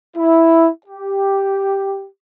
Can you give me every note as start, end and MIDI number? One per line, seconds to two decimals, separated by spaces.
0.16 0.68 64
0.86 2.06 67